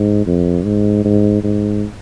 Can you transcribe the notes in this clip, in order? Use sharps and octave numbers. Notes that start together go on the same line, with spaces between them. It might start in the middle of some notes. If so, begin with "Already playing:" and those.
Already playing: G#2
F2
G#2
G#2
G#2